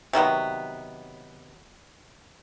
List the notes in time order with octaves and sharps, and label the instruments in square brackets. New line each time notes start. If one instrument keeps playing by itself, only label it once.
[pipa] C3 D#3 F#3 B3